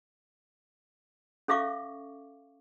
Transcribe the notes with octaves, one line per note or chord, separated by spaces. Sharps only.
C#4 A4 E5 F5 C#6 D6